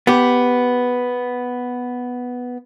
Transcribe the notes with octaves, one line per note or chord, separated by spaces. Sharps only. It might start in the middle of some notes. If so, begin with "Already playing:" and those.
B3 G4